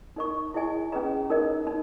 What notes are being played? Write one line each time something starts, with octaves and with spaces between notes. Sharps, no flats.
D#4 A#4 D#5 A#5 C#6
E4 G#4 D#5 G#5
C#4 G#4 B4 D#5 A#5
D#4 A#4 D#5
D#4